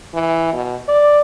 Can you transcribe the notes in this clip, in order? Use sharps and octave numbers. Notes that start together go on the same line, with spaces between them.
E3
B2
D5